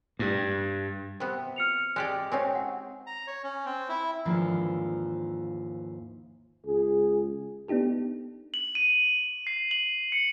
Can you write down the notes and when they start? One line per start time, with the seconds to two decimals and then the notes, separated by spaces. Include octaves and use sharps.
0.19 G2
1.20 C3 B3
1.56 F6 C#7 F7
1.96 G#3 G4 D5
2.32 C4 C#4 D#4 C#5 G#5
2.55 F#5
3.07 A#5
3.27 C#5
3.44 C#4
3.65 C4
3.89 E4
4.25 D#2 G#2 E3 F3 D4
6.66 C#2 G#4
7.68 B3 D4 D#4 G4 A4
8.54 F#7
8.75 D#7
9.47 C7
9.71 F#7
10.12 C#7